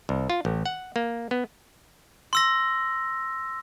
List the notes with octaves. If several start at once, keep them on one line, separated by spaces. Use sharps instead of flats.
C2
F4
A1
F#5
A#3
B3
C6 E6 A#6